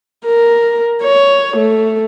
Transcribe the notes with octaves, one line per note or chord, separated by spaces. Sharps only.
A#4
C#5
A3